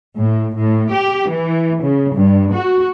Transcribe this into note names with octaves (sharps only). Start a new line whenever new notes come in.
A2
A2
G4
E3
C#3
G2
F#4